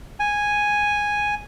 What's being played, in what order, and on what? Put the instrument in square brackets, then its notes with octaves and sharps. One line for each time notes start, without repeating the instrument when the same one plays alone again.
[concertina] G#5